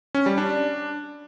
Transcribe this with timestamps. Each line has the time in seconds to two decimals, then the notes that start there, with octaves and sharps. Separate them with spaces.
0.15 C#4
0.26 G3
0.38 D4